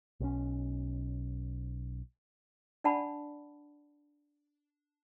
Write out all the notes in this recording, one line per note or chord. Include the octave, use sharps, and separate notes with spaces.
B1 C#4
D4 D5 F#5 A5 B5